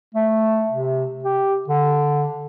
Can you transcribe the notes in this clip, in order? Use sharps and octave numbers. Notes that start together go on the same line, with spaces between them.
A3
C3
G4
D3